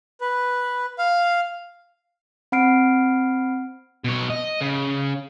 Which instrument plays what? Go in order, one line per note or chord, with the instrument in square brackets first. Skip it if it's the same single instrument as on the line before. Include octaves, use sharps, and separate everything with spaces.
[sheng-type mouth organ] B4
F5
[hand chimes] C4 F#5 B5 F6 C7 D7
[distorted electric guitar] B2 C#5
D#5
C#3